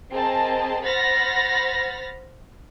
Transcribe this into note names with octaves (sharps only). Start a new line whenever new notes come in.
C4 G#4 A#4 D#5 A5
C5 F#5 B5 F6 A6 A#6